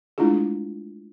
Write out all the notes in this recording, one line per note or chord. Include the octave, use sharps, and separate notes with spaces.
G#3 A3 D4 E4 F4 G#4